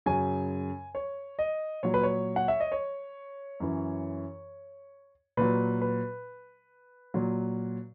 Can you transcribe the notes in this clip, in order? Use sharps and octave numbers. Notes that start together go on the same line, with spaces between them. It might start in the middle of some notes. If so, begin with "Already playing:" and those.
F#2 C#3 F#3 G#5
C#5
D#5
A#2 F#3 C#5
B4
C#5
F#5
E5
D#5
C#5
F#2 E3
A#2 F#3 B4
B4
A#2 F#3